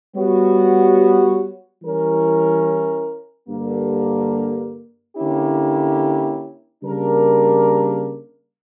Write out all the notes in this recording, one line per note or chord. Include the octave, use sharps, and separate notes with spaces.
G3 B3 F#4 C#5
E3 G3 C#4 E4 A#4
G2 D3 A#3
D3 A#3 C#4 E4 G4
C#3 G3 A#3 D4 A#4